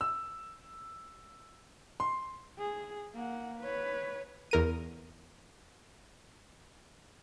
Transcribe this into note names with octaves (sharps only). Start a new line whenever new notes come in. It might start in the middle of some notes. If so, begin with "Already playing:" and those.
E6
C6
G#4
A#3 F#5
B4 C#5
E2 A#4 D#7